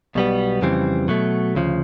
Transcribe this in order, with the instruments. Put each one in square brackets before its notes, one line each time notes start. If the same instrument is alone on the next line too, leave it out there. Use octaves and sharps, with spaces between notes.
[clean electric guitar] B1 B2 G3 B3
F2 C#3 E3 G3 C4
B2 F#3 A3
D2 C#3 F3